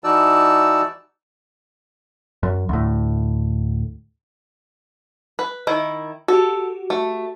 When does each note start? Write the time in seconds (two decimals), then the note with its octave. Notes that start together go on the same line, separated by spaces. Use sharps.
0.04 E3 D#4 F#4 D5 A5 E6
2.43 F#2
2.69 D2 A2
5.39 B4
5.67 D#3 E4
6.28 F#4 G4 A4
6.90 A3